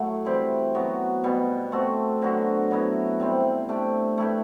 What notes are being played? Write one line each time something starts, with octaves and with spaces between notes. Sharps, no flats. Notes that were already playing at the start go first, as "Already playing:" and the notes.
Already playing: A2 F#3 A3
E3 G3 C4 G4
F#3 B3 F#4
B2 G3 B3
A3 C4 F#4 A4
D3 F#3 B3 F#4
F#3 B3 E4 B4
C3 G3 C4
A3 D4 G4
A3 E4 G4 B4